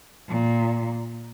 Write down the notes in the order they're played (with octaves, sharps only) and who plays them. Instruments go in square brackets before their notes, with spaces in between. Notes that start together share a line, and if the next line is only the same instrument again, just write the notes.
[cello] A#2